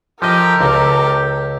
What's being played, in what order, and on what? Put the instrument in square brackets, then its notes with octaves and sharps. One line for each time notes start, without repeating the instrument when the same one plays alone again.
[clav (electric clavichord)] F3 D#5 [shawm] G4 [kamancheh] A4 A#4
[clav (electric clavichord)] C#2 [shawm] G4